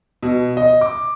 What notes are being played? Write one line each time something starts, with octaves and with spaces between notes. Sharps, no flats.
B2
D#5
D6